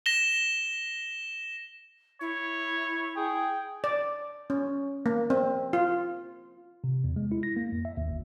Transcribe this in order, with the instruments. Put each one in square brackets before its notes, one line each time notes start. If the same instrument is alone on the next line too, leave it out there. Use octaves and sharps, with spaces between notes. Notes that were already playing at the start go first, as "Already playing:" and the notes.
[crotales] A#6 E7 G7
[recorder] E4 [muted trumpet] C#5
[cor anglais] G#4 [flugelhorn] G5
[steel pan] D5
C#4
A#3
C4
F4
[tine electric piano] C3
E2
G#3
E4
A#6
A#3
F2
E5
D#2
G1